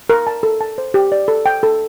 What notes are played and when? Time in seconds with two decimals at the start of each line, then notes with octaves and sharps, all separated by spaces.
0.10 A#4
0.27 A5
0.43 A4
0.61 A5
0.78 C5
0.94 G4
1.12 D5
1.28 A4
1.46 G5
1.63 A4